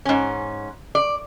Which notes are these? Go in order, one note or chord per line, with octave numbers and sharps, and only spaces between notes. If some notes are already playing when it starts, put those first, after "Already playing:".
G#2 C#4
D5